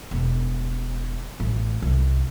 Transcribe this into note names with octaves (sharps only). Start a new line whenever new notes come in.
E1
A1
C2